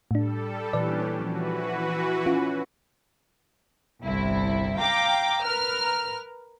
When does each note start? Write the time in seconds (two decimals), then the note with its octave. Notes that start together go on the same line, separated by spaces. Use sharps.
0.11 A2 G3 D4 A4
0.73 A#2 E3 C#4 D4 G4 B4 D5
1.21 E3 F3 F#4 B4
2.26 C#4 F4 B4
4.05 G1 C2 E4
4.77 F5 G5 A#5 D6
5.42 A#4 B4 F6